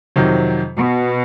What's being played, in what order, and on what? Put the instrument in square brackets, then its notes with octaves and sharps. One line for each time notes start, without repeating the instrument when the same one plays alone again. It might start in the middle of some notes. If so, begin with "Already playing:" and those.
[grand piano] F2 C3 D#3 F#3
[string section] B2